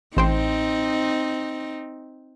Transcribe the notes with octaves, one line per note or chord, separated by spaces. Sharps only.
A1 C4 D#4 C5 G5